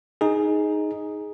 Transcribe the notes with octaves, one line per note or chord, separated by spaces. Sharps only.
D#4 G#4